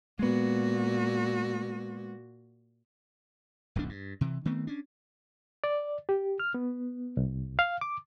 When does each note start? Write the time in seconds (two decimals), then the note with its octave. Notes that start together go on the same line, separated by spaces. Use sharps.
0.19 A#2 G#3 B3 F#4
3.76 D1 B1 F2 D4
3.89 G2
4.21 C3 E3
4.45 D#3 A3 B3 C4
4.67 C#4 D4
5.64 D5
6.09 G4
6.40 F6
6.54 B3
7.17 C2
7.59 F5
7.81 D6